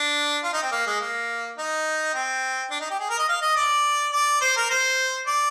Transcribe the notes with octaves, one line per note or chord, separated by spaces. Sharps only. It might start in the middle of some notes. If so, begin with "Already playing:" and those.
Already playing: D4
F4
D#4
C4
A#3
G#3
A#3
D#4
C4
D4
D#4
G4
G#4
A#4
D#5
F5
D#5
D5
D5
C5
A#4
C5
D5